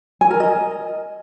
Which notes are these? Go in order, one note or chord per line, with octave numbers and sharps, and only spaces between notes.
G#5
A#4
D#5